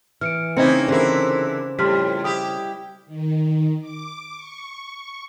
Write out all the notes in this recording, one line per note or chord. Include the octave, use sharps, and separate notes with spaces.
E3 F6 C#7 D7
C#3 A#3 C4 D#4 E4 G#6 C#7
D3 E3 E4 G#4 A#4 C5
F2 A2 G3 C6 F6 B6
E4 G4 D#6
D#3
D6
C#6